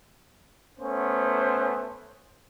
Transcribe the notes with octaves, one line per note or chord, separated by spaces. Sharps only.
A3 B3 C#4 C5